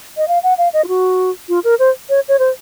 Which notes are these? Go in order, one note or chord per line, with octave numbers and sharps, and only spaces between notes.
D#5
F5
F#5
F5
D#5
F4
F#4
F4
A#4
C5
C#5
C#5
C5